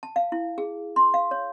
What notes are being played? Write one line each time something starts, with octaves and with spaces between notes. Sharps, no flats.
A5
F5
E4
G#4
C6
F5
C#5